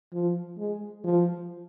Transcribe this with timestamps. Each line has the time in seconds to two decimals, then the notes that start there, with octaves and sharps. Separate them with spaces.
0.13 F3
0.58 G#3
1.04 F3